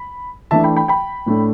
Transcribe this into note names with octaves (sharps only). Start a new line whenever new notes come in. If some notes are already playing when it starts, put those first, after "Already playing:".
Already playing: B5
E3 A3 D4 E5 A5
G5 B5
G5 B5
G5 B5
A2 A3 D4